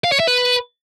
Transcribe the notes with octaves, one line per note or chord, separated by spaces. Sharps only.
F5
C#5
E5
B4